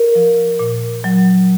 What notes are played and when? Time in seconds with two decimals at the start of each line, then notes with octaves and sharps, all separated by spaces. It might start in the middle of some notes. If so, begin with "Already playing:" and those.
Already playing: A#4
0.15 F3
0.59 A#2
1.04 F#3